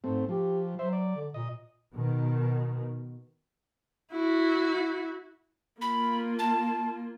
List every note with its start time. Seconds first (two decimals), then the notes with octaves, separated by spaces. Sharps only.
0.04 G#2 A3 C4
0.29 F3 G4
0.79 F#3 C5 E5
0.93 D5
1.15 D3
1.34 A#2 D#5
1.93 B2 D#3
4.11 E4 F#4
5.81 A#3 F4 B5
6.39 A5